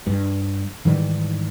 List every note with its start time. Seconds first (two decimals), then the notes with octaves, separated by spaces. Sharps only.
0.07 G2
0.85 G#2 D#3 E3 G3